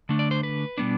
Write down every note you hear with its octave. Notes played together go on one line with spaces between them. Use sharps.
D3 A3 D4
D5
C5
B4
B2 G3 B3 D4